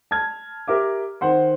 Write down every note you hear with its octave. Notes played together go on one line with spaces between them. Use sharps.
A5 F6 G#6
G4 A#4 E5 D6
D#3 C5 F#5 C6